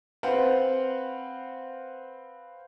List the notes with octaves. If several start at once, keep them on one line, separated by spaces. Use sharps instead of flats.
C4 B4 C5 F5 F#5